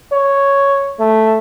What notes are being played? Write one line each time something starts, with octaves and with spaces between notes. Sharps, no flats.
C#5
A3